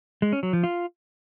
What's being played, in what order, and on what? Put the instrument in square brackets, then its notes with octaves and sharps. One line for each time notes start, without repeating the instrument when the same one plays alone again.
[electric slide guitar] G#3
C#4
F#3
F3
F4